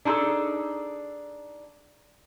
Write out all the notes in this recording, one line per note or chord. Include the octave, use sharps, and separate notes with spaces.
D4 D#4 F4 G#4 A4